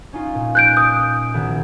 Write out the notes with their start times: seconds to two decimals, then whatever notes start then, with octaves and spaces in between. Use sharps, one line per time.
0.13 C#4 D#4 F4
0.35 A#2
0.55 F#6 G6 D7
0.77 D#6
1.34 B1 D#3